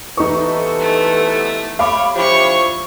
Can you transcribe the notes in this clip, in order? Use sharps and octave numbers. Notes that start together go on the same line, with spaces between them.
C3 E3 B3 D#4 A4 C#6
A3
C#5 F5 B5 D6
F3 D4 E4 G4 C#5 C#6